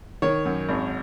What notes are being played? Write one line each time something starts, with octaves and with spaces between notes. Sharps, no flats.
D#3 C#5
F#2
G#1